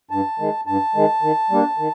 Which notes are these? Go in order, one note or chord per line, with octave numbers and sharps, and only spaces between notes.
G2 A5
D#3 G#3
G2 A5
D#3 G#3
D#3
G3 A#3 D4
D#3